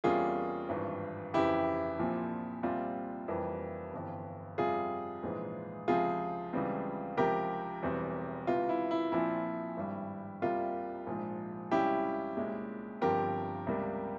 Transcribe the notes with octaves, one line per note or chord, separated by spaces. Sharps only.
E2 C3 G3 A#3 C#4 F4 G#4
G#1 G2 E3
F1 F2 C#3 E3 E4 G4
A#1 A#2 F3 C4
C2 A#2 G3 C4 F4
F1 F2 E3 G3 A#3
G1 F2 E3
F2 C3 G3 F4 G#4
A#1 G#2 E3 G#3
C#2 C3 F3 C4 F4 G#4
C#2 C#3 E3 G3 C4
C#2 C3 F3 C4 G4 A#4
E1 E2 E3 G3 C4
C#2 C3 E3 F4
E4
E4
A#1 A#2 F3 C4 E4
G#1 G2 G3
C2 C3 G3 A#3 F4
A#1 G#2 F3
C#2 C3 G3 C#4 E4 G4
C2 A#2 G#3 C#4
G1 G2 F3 C4 G4 A#4
C#2 C3 G3 A#3